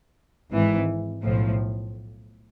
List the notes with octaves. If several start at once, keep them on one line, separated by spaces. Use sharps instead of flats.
G#1 G#2 E3
B1 A2 F3